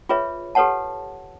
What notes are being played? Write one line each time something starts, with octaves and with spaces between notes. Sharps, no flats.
F4 G#4 B4 C#5 E5
G4 A4 B4 C#5 F#5 A5